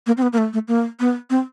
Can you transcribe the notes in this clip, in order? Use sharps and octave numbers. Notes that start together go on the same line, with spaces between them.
A#3
C4
B3
A#3
A3
A3
A#3
B3
C4